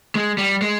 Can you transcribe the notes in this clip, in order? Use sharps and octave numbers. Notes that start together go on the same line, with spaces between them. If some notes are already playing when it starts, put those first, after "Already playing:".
G#3
G3
G#3